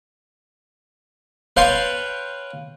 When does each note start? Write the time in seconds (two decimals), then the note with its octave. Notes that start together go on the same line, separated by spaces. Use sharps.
1.57 B4 C#5 F5 G5 A5 C6